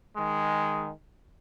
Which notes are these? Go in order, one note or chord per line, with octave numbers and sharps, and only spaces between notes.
D#3 G#3